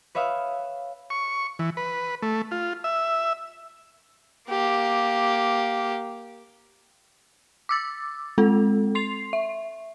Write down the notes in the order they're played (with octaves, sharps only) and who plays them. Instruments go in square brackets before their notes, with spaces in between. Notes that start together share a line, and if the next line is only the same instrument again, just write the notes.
[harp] B4 C#5 E5 F5 D#6
[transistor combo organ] C#6
E3
B4
A3
F4
E5
[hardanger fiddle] A#3 G4
[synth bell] D6 E6 A6
G#3 C4 A4
C6 C7 F7
E5